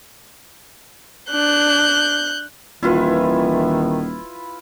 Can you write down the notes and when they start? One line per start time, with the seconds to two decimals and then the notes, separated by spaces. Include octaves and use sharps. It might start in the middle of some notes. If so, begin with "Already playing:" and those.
1.31 D4 F#6 G6
2.83 D#1 D#3 E3 E4 F4 B4